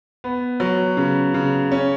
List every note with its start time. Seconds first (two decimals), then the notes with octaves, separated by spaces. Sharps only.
0.24 B3
0.60 F#3
0.97 C#3
1.34 C#3
1.71 C#4